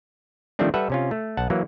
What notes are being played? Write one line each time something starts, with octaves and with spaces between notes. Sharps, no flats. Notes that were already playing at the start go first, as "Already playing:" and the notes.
D#3 F3 G3 A3 C4 D4
G3 A4 B4 E5 F#5
C3 C#4 F4
A3
B1 F#5 A5
E3 F#3 A#3